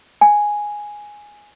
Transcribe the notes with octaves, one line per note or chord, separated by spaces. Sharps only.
G#5